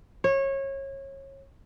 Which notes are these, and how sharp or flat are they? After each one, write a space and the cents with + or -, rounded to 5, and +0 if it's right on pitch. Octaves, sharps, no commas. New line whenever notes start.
C#5 -25